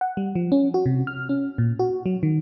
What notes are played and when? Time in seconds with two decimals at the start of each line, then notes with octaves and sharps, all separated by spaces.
0.01 F#5
0.17 G3
0.35 F3
0.52 C#4
0.74 F#4
0.86 C3
1.07 F6
1.29 C#4
1.58 A#2
1.79 F#4
2.06 F#3
2.23 D#3